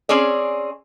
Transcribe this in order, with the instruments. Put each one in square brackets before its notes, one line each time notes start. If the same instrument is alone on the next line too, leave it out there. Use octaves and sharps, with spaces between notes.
[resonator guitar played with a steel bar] C4 C#4 G#4 C#5 D5